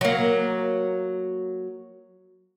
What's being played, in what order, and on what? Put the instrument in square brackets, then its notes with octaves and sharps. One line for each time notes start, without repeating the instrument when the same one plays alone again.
[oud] F#3 A#3